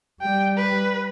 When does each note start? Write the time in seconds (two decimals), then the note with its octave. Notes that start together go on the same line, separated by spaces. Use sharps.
0.21 G3 G5
0.57 B4